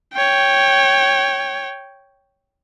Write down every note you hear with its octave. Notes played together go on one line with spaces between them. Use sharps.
C#5 G5